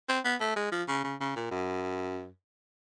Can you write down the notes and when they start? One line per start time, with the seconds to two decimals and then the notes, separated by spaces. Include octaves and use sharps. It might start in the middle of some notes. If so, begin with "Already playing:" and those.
0.09 C4
0.24 B3
0.40 A3
0.56 G#3
0.72 F3
0.88 C#3
1.04 C#3
1.20 C#3
1.36 A#2
1.51 F#2